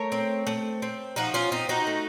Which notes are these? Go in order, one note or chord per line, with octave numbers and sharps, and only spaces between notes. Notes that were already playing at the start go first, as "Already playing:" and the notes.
Already playing: A3 A#4 C#5
C4
A3
C4
F3 D#4 F#4
C#4 F4
C4 D#4
D#4 F#4
A3